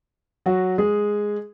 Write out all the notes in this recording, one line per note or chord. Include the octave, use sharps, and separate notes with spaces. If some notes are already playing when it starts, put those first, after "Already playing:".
F#3 F#4
G#3 G#4